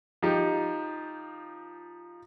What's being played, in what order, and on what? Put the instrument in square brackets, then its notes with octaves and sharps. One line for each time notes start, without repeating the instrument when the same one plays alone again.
[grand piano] F3 D#4 G4